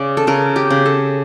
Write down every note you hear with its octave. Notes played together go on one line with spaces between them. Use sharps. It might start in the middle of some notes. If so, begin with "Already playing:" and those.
Already playing: C#3 D5
A4
C#3 A#4
G4
C#3
A4